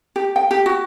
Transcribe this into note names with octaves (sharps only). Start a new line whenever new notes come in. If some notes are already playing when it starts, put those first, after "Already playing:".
G4
G5
G4
F#4